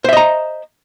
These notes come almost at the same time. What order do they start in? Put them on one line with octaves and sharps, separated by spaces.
C5 E5 D#5 A#5